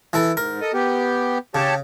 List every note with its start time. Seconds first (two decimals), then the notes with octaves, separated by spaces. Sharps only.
0.13 E3 E4 A4
0.37 G#2 A#4
0.61 A4 D#5
0.74 B3 G4
1.55 C#3 G4 C#5 A5